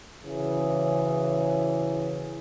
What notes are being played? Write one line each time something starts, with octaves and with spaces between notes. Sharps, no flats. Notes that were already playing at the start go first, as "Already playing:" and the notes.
C#3 E3 F#3 G#4